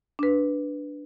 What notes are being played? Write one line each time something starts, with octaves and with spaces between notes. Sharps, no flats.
D4 B4